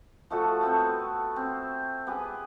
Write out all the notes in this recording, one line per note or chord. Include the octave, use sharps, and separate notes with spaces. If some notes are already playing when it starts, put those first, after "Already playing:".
F3 A3 F#4 A4
A3 B3 C4
B4
C4
B3 G4 G#4